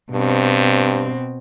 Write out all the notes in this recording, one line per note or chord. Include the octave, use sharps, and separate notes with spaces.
G2 B2 C4